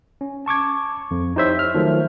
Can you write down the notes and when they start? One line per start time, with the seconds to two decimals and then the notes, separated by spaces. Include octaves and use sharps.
0.21 C#4
0.46 A5 C#6 D6 G#6
1.11 F2
1.36 D#4 E4 G4 C5 C#5 E5
1.59 F6
1.74 D#3 F3 F#3 A3